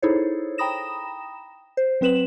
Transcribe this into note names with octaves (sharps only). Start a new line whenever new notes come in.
D#4 E4 G#4 A4 C5 C#5
G5 A#5 B5 D#6 A#6 E7
C5
F#3 C4 B4 E7 F#7